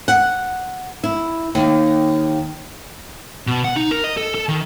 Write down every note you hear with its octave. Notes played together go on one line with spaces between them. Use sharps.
F#5
E4
D#2
B2
F#5
D#4
A#4
D#5
A4
A4
D#3